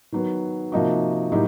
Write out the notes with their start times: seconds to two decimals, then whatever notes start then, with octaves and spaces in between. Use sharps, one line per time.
0.12 D#3 F#3 B3
0.72 C3 F3 A#3 D#4 F#4
1.32 A2 F#3 A#3 D#4 G4